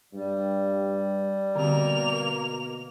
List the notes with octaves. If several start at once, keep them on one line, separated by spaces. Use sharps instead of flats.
G2 G3
B2 D3 A#3 C4 G4 F7